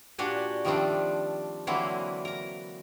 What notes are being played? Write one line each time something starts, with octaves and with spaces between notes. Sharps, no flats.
A#2 D4 F#4 G4 G#5
D#3 F3 G3 A3 C4 D4
D3 E3 F#3 A#3 C4 E4
A#4 A#5